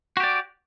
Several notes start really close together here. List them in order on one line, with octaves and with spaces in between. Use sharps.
F#4 G4 D5